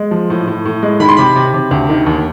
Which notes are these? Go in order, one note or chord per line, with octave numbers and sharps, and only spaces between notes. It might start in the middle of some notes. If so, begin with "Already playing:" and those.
Already playing: G#3
F3
A2
A2
A2
G#3
D#3 B5
C6
C3 B5
C3
C3
D2
D#3
D#2